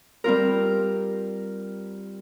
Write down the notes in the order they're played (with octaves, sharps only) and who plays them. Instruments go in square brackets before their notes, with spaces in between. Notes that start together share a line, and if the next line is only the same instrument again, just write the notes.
[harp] G3 C4 F4 A#4